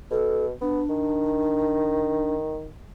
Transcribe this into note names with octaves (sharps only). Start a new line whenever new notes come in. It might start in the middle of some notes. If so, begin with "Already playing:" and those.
B2 A4
B3 D4
D#3